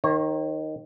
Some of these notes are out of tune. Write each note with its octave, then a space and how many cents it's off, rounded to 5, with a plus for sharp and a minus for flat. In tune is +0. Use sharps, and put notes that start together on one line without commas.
D#3 +0 C#5 -45